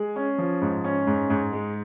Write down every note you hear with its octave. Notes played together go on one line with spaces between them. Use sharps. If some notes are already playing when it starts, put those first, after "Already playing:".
Already playing: G#3 G#4
C#4
F3
G#2
C#4
G#2
G#2
G#3